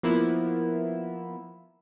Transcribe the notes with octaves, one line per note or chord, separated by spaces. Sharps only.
F3 A#3 B3 E4